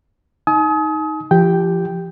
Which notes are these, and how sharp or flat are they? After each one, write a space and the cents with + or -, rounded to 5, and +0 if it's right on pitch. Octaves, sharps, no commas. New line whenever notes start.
D#4 +10 G#5 +45 D#6 +30
F3 -35 G4 +0 G5 +0